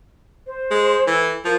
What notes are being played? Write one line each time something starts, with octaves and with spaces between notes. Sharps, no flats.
C5
G#3
E3 A4
F3 A#4